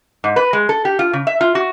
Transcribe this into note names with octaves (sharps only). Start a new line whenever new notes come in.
G#2
B4
G#3
A4
G4
F4
C#3
E5
F4
F#4